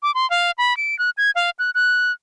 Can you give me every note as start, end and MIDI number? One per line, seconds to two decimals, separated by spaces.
0.03 0.14 86
0.14 0.29 84
0.30 0.51 77
0.58 0.76 83
0.77 0.97 98
0.99 1.10 90
1.17 1.31 92
1.35 1.50 77
1.59 1.71 90
1.75 2.12 90